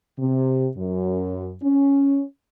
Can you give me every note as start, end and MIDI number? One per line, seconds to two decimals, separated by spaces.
0.19 0.68 48
0.77 1.55 42
1.63 2.23 61